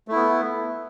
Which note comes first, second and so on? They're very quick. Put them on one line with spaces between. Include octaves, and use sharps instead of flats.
A3 E4 B3